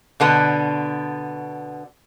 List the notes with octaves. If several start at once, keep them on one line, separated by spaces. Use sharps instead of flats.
B2 D3 B3